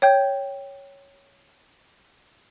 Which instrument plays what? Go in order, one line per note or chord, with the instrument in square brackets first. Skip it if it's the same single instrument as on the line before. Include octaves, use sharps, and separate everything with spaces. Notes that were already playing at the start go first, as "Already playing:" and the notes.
[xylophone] C#5 G5 G6